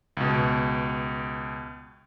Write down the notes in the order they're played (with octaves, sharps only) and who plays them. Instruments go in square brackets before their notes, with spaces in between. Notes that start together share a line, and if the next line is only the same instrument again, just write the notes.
[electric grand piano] C#2 B2